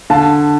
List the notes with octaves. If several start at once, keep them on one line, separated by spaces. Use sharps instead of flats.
D3 F5 A5